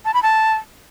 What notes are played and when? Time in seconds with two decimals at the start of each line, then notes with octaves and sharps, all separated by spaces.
0.05 A5
0.14 B5
0.23 A5